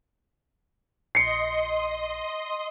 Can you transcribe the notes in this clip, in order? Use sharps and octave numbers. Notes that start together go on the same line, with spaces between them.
A#1 D#5 C6 C7 C#7